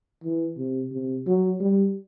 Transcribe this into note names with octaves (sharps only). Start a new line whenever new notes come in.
E3
C3
C3
F#3
G3